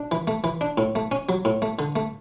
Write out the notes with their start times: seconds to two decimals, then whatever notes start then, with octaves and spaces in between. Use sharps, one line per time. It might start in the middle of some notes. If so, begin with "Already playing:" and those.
Already playing: D4
0.11 E3
0.27 A3
0.44 E3
0.61 D4
0.78 A2
0.95 A3
1.11 C#4
1.29 F#3
1.45 A2
1.62 A3
1.79 D3
1.96 A3